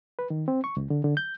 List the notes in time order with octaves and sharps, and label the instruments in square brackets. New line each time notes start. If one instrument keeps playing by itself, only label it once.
[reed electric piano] B4
D#3
C4
C#6
C#2
D3
D3
G6